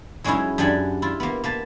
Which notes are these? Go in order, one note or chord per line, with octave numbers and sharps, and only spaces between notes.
F#3 G#3 C#4 D#4 E4
F#2 D4 G4 D5 F#5 G#5
E4 F4
A#3 B3
A#3 B4 A5